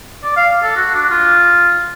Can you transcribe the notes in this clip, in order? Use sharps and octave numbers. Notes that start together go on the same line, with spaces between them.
D5
F5
A4
F#4
D4
F4